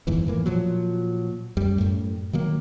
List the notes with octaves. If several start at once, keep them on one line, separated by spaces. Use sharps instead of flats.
F#1 E2 G#2 E3
A2 E3 A#3
A#2 F3 F#3
F#2 G3
F#2 A2
D#3 F#3 A#3